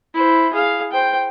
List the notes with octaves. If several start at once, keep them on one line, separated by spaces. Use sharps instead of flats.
E4 C5
G#4 F5
C5 G5